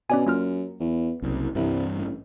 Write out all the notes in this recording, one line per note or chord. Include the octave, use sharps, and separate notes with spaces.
B2 C#4 D5 G#5
F#2 A#3 F4 F6
E2
F#1 C2
C2 G2 E3
A1